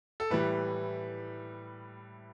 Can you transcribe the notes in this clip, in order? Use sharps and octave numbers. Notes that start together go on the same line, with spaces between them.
A4
A2 E3 G3 B4